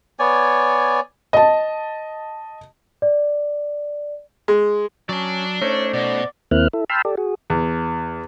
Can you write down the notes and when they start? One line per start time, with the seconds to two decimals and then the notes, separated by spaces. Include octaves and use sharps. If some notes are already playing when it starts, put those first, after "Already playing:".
0.19 B3 C#5 D5 G#5
1.33 D#5 A5
3.02 D5
4.48 G#3
5.09 F#3 C#4 D5 A5
5.62 A3 C#4 D#4 C5 C#5
5.93 B2 D5
6.51 D#2 A#3 C4 E4 F6 F#6
6.73 E4 A4
6.90 G5 A5 B5 C6 E6 F6
7.05 G4 A4 D5
7.17 F#4 G#4
7.50 E2